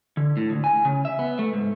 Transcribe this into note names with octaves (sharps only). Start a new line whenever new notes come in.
D3
A2
D2
G#5
C#3
E5
B3
A3
G#2